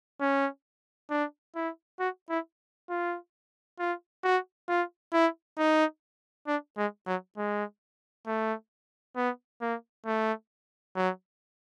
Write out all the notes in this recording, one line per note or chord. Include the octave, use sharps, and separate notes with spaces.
C#4
D4
E4
F#4
E4
F4
F4
F#4
F4
E4
D#4
D4
G#3
F#3
G#3
A3
B3
A#3
A3
F#3